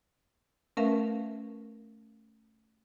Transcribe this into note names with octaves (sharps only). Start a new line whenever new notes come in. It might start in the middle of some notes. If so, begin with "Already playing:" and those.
A3 C#4 A#4 B4 E5 F5